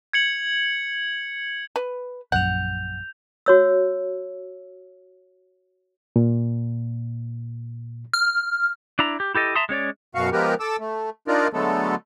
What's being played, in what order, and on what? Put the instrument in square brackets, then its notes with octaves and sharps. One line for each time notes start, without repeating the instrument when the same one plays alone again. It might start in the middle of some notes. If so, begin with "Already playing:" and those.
[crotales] G#6 C#7 F#7
[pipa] B4
[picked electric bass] A#1 F#2 [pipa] F#5 [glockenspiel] G6 F7
[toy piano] F#4 C#5 E6
[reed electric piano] A#2
[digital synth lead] F6
[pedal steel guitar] D4 E4 A#5
G4
E4 G4 A4 D#5
E5 A5 A#5 C6 D#6
G#3 C#4 C#5 D5
[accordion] F#2 B2 F#4 F5 C#6
F3 G#3 B3 G4 A#4 B4
A4 D6 E6
A3
D4 D#4 F4 A#4 D5
D3 F#3 G#3 A3 B3 A4